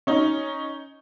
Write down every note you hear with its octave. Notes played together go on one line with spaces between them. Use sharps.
C#4 D#4